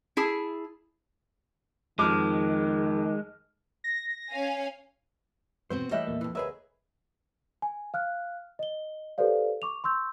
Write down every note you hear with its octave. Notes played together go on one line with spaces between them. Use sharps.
E4 G#4 A5
F2 D#3 G#3 D6 F6
A#6
C#4 F5 G#5
E2 B2 B3 C4 F#4 C5
E3 G3 A3 C#5 D#5 E5 G5 F#6
E2 A#2 A#3
F2 E3
D2 G#4 A#4 B4 C#5 D#5 E5
G#5
F5 F6 F#6
D#5 G7
G4 A4 B4 C5 D5 F5
C#6 D6 F7
C6 C#6 E6 G6